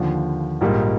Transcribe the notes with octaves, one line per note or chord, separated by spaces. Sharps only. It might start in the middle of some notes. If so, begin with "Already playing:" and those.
Already playing: D#2 D3 F3
A#1 G#2 G3 A#3 D#4